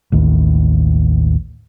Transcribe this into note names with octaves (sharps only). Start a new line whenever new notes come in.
A1 D#2